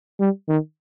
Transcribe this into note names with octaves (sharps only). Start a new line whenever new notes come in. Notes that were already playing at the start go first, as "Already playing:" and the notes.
G3
D#3